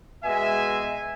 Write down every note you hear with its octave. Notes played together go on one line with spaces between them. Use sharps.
B2 G#3 E5 G#5